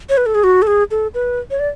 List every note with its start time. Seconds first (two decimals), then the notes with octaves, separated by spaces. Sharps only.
0.09 C#5
0.17 B4
0.26 A4
0.35 G#4
0.44 F#4
0.62 A4
0.67 G#4
0.91 A4
1.14 B4
1.51 C#5
1.59 D5